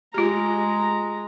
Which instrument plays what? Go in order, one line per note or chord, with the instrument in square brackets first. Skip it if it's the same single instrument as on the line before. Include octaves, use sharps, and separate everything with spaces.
[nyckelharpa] G#3 A#5 [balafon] F4 G4